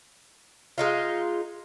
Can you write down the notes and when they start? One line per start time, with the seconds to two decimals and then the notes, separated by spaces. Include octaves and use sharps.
0.78 G#3 D#4 F4